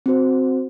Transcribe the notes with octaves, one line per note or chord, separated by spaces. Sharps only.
C4 F#4 C5